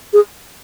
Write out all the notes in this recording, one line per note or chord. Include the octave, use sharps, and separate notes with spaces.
G#4